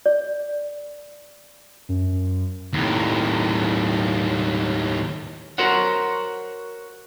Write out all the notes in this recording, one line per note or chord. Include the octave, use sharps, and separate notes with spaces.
D5
F#2
D#2 A2
F#4 A#4 C5 C#5 F#5